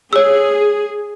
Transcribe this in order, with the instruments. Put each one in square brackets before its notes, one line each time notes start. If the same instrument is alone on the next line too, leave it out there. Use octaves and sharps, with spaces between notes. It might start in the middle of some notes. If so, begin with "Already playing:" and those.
[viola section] G#4 [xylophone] C#5 E6